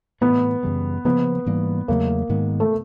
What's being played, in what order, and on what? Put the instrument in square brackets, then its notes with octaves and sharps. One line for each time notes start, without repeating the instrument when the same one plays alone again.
[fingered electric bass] A2 E3 A3 [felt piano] B3
[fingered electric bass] F#2 C#3 E3 G3
[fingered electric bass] C#3 F3 A#3 [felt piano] B3
[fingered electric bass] G#2 E3 G3 A#3
[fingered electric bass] E2 C#3 F#3 A3 [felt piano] A#3
[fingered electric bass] G#2 D#3 G#3 B3
[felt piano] A3